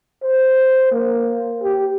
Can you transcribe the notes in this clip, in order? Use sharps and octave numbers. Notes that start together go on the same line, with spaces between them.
C5
A#3
G4